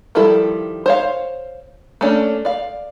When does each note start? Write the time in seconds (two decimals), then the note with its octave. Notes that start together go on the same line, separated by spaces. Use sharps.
0.15 D#3 F3 G3 E4 A4
0.86 C5 C#5 F5
2.01 A3 A#3 C#4 D4
2.45 D5 F5